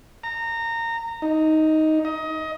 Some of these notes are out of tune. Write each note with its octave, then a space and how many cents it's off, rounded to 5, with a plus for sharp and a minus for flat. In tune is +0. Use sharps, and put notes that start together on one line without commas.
A#5 -20
D#4 +10
D#5 +25